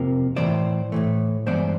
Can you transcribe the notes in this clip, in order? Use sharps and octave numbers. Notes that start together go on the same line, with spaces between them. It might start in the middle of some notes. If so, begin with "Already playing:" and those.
Already playing: F2 C3 F3 A#3
A2 E3 A3 C5 D5
A2 E3 A3
G2 E3 G#3 B3 C5 D5